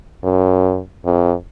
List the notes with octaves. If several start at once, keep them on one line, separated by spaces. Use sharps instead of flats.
F#2
F2